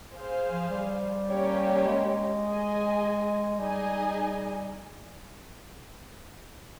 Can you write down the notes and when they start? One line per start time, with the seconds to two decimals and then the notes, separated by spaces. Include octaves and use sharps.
0.13 G#4 C5 F5
0.51 F3
0.70 G3
1.28 A#3 C#4 G4 C#5
1.86 G#3
2.43 G#4 D#5 G#5
3.59 G3 D#4 G#4 D#5 G#5